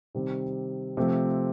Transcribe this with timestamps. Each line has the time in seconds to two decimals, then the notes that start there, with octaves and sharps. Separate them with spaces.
0.14 C3 D#3 G3 C4
0.97 C3 F3 A3 C4